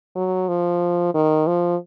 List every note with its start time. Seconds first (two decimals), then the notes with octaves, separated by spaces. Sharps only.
0.15 F#3
0.48 F3
1.14 D#3
1.47 F3